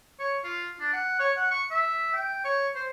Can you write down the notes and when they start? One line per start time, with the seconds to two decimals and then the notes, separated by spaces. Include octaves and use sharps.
0.19 C#5
0.44 F4
0.80 D4
0.93 F#5
1.19 C#5
1.37 F#5
1.51 C#6
1.71 E5
2.13 G5
2.45 C#5
2.75 C5